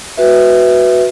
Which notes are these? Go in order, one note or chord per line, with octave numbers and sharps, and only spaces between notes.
F#4 B4 E5